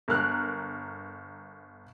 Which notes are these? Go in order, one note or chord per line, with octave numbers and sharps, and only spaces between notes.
G1 A#4 F6 F#6